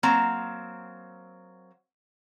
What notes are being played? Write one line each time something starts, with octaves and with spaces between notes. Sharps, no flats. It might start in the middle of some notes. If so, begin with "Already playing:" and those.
F#3 A#3 C4 A#5